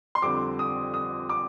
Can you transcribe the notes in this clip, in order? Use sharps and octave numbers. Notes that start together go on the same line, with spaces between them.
C6
F2 D3 G3 C4 D6
D#6
D#6
D6